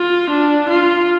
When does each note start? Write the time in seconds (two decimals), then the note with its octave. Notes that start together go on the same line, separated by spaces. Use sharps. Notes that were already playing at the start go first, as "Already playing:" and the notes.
Already playing: F4
0.30 D4
0.69 F4